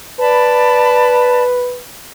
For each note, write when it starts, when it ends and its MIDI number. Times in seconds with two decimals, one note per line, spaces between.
0.20 1.80 71
0.20 1.44 74
0.20 1.44 81
0.20 1.44 83